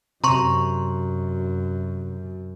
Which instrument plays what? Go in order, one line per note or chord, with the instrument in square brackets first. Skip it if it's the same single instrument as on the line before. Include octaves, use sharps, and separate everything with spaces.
[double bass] F#2 [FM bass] C3 [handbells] A#5 C6 C#6